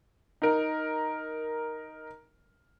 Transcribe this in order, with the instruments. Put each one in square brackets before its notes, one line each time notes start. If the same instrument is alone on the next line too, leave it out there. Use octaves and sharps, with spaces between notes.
[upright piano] D#4 A#4